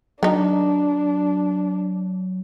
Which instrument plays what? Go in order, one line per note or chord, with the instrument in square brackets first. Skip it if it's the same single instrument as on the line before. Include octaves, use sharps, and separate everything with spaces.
[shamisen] D#3 D#4 A#4 [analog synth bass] F#3 [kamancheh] D4